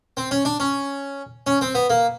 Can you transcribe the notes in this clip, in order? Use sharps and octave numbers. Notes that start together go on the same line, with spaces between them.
C4
C#4
D4
C#4
C#4
C4
B3
A#3